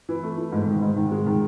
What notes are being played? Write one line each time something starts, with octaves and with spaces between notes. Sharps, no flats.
E3
A3
E3
G#2
D#3
G#2
D#3
G#3
D#3